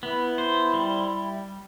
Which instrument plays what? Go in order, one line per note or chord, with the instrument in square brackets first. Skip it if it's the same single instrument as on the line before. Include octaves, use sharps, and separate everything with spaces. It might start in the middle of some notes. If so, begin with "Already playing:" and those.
[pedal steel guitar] B3 [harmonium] E4
[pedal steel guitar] C5
G3